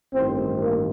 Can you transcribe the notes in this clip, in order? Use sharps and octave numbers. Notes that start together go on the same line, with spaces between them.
A1 G2 D#3 C4 C5
A#3 A#4